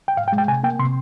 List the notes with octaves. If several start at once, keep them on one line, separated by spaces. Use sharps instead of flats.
G5
G#2 F5
G5
G#3
G5
C3 G#5
A#3 G5
C3 C6